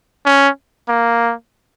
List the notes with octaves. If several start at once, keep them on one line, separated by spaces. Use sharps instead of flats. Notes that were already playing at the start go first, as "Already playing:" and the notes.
C#4
A#3